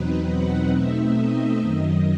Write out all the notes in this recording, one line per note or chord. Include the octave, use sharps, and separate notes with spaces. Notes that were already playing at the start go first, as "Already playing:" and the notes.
Already playing: E2 B2 F#3 C4 D#4 B4
F#5
B2 A3 C4 D#4 E5
D#5
F#2 D#3 F#3